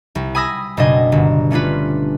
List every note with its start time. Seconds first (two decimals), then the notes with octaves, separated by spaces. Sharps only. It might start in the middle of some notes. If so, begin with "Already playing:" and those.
0.15 C2
0.35 G#5 B5 D#6 E6 A#6
0.77 F#1 B2 D4 C5 D#5 G#5
1.12 G1
1.50 A3 C#4 D4 F4 B4